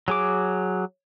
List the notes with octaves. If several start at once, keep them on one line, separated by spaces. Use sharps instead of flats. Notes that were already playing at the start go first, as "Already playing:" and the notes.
F#3 G#4 D6